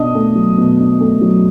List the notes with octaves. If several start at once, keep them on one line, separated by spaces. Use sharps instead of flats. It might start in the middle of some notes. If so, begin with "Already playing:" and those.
Already playing: B2 D4 D#5 D#6
A3
F#3
B2
D4
A3
F#3